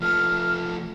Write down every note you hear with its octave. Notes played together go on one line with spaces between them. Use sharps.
F3 A3 F6